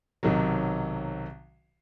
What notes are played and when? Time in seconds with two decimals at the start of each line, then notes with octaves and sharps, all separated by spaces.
0.23 B1 C3 D#3 F#3